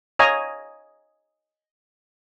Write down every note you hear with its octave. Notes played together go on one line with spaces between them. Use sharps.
C#5 D#5 F5 G#5 A#5